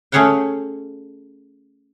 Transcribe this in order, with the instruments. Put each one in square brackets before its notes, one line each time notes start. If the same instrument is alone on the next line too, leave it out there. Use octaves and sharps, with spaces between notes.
[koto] A3 C#4 G#4 C#5 F#5 G5